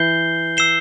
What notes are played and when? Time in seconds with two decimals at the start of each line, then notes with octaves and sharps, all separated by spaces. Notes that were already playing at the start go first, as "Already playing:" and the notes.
Already playing: E3 G6 C7 G7
0.57 E6 C7 E7 G7